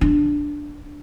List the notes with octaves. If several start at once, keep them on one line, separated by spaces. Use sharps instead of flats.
D4